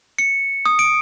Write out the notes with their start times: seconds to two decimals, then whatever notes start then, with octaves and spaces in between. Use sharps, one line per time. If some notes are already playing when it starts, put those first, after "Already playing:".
0.18 C#7
0.66 D#6
0.79 D7